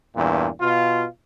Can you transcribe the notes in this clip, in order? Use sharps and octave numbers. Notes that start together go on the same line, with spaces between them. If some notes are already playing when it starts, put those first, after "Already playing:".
E2 G2 A#2
B2 F4